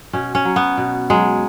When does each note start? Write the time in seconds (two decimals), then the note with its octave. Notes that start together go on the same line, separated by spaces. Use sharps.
0.13 B2 C#4
0.35 C#4
0.45 F#3
0.56 B3
0.77 B2
1.10 F#3 G#3